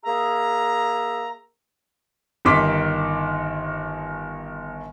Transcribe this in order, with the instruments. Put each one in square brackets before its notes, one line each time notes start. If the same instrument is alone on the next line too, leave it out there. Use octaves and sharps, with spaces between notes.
[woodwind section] A#3 G#4 E5 A#5
[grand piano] G1 D#3 C6 D6 B6